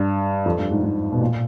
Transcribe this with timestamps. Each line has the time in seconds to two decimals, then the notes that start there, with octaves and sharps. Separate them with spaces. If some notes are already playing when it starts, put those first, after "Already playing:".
Already playing: G2
0.46 F2
0.59 G2
0.71 G#2
0.83 G#2
1.12 B2
1.21 A#2